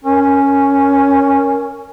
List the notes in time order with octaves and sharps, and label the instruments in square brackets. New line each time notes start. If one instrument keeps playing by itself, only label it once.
[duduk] C#4 [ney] A#4